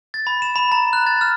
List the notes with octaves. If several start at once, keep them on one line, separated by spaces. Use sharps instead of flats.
A6
B5
E7
B5
A#5
F#6
A6
F6